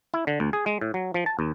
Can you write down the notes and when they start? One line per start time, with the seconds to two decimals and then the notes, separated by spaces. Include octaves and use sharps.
0.14 E4
0.27 D3
0.40 D2
0.53 G#4
0.66 G#3
0.81 A2
0.94 F#3
1.14 F3
1.26 A5
1.39 D#2